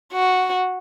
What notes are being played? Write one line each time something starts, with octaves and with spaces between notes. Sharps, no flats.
F#4